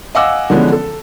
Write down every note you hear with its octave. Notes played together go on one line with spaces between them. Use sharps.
D#5 F5 F#5 G#5 D6 E6
D3 E3 F3 G#3 B3 C#4
A4